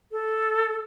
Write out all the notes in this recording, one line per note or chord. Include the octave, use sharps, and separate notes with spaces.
A4